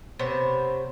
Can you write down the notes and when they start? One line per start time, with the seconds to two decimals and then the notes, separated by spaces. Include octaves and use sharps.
0.19 C3 B3 C5 C#5